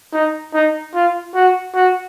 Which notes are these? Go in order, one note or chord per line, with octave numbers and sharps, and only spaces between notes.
D#4
D#4
F4
F#4
F#4